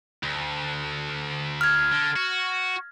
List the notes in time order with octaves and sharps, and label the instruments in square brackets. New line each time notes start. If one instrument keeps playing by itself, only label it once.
[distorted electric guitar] D2
[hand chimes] F6 G#6
[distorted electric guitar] D3
F#4